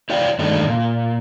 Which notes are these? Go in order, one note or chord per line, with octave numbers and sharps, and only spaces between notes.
E4 C#5 D5 F5 G5
G2 D#3 G#3 A3 D4
A#2